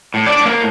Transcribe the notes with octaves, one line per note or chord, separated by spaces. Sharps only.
A2
D4 D5
A2
A#3 A#4